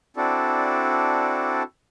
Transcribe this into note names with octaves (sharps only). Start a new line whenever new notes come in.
C4 D4 E4 F#4 A4 D5